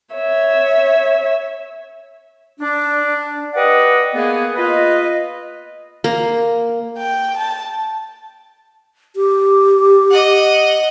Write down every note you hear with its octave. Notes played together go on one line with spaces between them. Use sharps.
C#5 E5
D4
G4 B4 D5 D#5 F#5
A#3 B3 G#4
F4 B4 D#5
A#3
G5
A5
G4
D#5 F#5